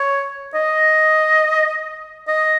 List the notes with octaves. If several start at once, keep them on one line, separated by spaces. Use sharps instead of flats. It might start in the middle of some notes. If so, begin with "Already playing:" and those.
Already playing: C#5
D#5
D#5